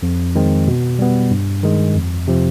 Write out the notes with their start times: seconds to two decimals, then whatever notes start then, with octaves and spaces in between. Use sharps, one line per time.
0.03 F2
0.35 D#3 G#3 C4
0.68 B2
0.99 G3 B3
1.31 G2
1.63 D#3 G#3
1.95 F2
2.28 C3 F3